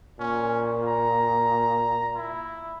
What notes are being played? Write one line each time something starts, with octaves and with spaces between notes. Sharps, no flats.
A#2 C#4
A#5
E4